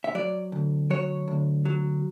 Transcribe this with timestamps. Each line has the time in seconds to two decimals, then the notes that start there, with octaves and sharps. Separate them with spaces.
0.04 E5
0.15 F#3 D5
0.52 D2
0.90 F#3 C#5
1.28 D2
1.65 F#3